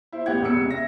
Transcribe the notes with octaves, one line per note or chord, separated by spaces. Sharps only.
E4 C5
A1 B3 G4 F#5 G#6
E1 E2 G4 E6 C#7
C#2 C3
E5 A#6